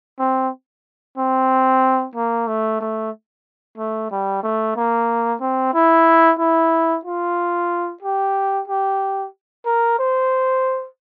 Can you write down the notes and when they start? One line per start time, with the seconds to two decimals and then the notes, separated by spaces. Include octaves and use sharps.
0.19 C4
1.18 C4
2.15 A#3
2.47 A3
2.81 A3
3.78 A3
4.11 G3
4.43 A3
4.76 A#3
5.41 C4
5.74 E4
6.39 E4
7.05 F4
8.03 G4
8.68 G4
9.65 A#4
9.99 C5